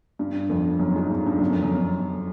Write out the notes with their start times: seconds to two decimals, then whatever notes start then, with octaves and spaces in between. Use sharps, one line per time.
0.19 G2
0.50 F2
0.80 F#2
0.96 G#2
1.10 G2
1.26 G2
1.39 F#2
1.50 F2
1.63 F#2